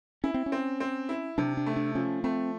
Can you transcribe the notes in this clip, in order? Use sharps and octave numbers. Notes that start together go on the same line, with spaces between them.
C#4 E4
C4
C#4
C4
C4
E4
C3 D4
D4
A3
D4
F3 C#4
A3 C4